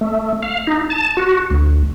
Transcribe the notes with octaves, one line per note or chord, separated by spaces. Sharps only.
A3
F5
D#4
A5
F#4
D2